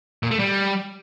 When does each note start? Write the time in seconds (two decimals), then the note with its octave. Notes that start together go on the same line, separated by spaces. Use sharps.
0.23 A#2
0.31 A3
0.39 G3